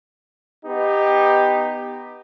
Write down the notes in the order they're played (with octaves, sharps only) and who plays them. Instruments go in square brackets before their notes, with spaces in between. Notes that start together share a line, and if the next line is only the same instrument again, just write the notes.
[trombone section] B3 D#4 G4